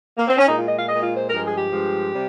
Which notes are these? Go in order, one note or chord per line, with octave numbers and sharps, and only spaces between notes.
A#3
C4
C#4
A#2 G#3 D#4
F4
D#5
F5
A#2 G#3 D#5
F4
C5
G2 F3 G#3 A#4
G#4
G4
G2 F3 G#3
C3 G3